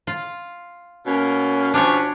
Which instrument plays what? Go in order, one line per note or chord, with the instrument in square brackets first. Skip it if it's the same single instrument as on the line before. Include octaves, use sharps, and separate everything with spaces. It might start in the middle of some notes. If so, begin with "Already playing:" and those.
[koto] F4
[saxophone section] B2 A#3 C#4
[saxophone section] B2 F3 C#4 [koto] D4 C#5